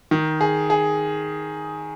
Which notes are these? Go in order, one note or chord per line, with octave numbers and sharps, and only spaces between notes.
D#3
G#4
G#4